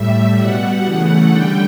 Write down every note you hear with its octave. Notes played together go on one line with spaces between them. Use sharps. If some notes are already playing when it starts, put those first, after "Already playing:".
Already playing: A2 G3 E5
B2 G3 F#5
C#3 E3 A3
D3 G3 G5